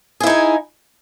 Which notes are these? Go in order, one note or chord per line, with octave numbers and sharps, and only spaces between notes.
D#4 E4 G#4 G#5